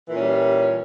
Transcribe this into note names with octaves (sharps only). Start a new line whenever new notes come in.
A#2 E3 G3 C#4